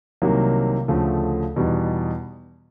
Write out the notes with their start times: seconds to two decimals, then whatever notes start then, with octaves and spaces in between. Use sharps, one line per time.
0.22 C2 C3 D#3 F#3 A#3
0.88 D2 C#3 F3 A3
1.56 E2 B2 G3 B3 D#4